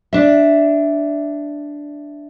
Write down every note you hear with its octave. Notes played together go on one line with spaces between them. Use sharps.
D4 E5